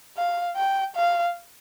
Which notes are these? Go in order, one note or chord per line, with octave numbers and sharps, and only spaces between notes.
F5
G5
F5